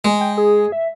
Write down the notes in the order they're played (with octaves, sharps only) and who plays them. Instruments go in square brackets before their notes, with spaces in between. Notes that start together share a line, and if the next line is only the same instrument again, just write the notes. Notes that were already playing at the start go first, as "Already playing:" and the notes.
[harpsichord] G#3
[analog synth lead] G5
G#4
E5